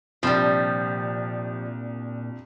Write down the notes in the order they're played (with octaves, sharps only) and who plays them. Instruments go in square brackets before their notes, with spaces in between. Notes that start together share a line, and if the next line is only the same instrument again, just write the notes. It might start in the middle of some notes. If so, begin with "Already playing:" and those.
[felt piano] C2 D4 [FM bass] A#2 [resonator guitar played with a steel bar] F3 G3